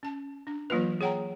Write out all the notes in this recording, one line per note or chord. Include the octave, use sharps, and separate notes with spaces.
C#4 A5
D4
E3 F#3 A#3 F4 B4
G#4 C#5 F#5 G5 A#5